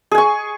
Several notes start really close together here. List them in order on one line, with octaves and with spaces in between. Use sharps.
G#4 G#5 C#6